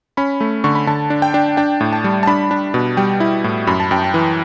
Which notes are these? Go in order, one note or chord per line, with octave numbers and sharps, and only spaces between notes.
C#4 B5
A3
D3 C#6
B5
D3 A5
D4
G5
D4
D4 G5
A2
A5
G3
A5
D4 B5
D4
B2
G3 G5
E4
A2
F#2 B5
A5
F#2 G5
A5
E3